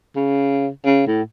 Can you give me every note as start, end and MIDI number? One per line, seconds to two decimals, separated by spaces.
0.16 0.68 49
0.85 1.05 49
1.07 1.22 45